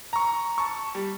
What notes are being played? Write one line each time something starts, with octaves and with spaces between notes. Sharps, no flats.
A#5 C#6
A5 C#6
G3